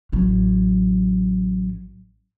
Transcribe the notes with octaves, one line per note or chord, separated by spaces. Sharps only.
A1 F#3